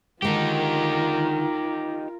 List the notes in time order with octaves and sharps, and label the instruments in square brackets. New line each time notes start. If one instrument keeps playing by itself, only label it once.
[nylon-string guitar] D3 D#3 G#3 [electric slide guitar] D#4 G4 [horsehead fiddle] F4 A#4